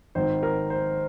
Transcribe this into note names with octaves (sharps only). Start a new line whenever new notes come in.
G#1 G#2 D#3 C5
A#4
C5